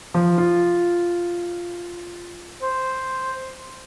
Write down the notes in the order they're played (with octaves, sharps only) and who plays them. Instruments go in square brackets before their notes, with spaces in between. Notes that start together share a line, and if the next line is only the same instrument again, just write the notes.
[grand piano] F3
F4
[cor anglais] C5